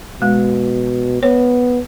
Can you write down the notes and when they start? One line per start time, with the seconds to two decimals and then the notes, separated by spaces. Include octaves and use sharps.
0.22 B2 G#3
1.23 B3 C#5